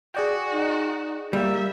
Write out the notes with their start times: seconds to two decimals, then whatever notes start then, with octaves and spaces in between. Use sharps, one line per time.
0.15 F#4 G#4 D5 G5
0.52 D#4
1.33 G3 A#3 E5